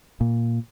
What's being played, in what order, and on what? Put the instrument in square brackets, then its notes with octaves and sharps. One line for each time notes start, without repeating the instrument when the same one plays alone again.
[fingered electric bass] A#2